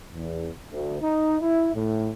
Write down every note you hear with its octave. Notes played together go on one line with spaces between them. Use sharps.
E2
D2
D#4
E4
A2